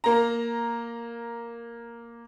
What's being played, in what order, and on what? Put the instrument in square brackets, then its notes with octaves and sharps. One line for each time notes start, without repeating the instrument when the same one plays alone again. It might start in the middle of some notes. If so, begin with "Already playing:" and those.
[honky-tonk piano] A#3 A#5